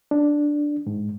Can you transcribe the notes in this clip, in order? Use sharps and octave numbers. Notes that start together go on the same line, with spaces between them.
D4
G#2